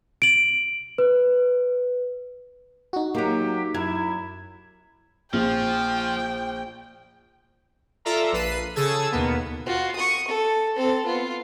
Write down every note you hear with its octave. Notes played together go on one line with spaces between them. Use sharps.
D7 F#7
B4
D#4 F#4
F#3 A#3 G4
F#2 E4 G#6
A#1 F3 G5
F4 A4 D5 E5 A#5
A#1 B4 C7 D#7
C#3 G#4 A4 A5 E6 G#6
D#2 B2 A#3 B3
F4 F#4
C#6 D#6
A4
C4 A4
B3 F4